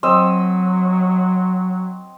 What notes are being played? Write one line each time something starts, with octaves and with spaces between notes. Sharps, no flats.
F#3 C4 D#5 E6